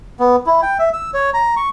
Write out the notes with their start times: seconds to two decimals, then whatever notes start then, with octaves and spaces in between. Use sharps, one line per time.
0.19 B3
0.46 E4
0.62 G5
0.79 E5
0.93 E6
1.14 C#5
1.34 A#5
1.56 C#6